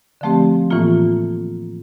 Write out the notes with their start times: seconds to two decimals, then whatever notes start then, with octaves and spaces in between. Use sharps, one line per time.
0.21 D3 F3 A3 C4 G4
0.70 A2 E3 A#3 F4